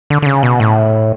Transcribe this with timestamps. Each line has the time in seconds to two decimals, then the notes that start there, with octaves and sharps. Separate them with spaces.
0.10 D3
0.22 D3
0.26 C#3
0.43 B2
0.60 A2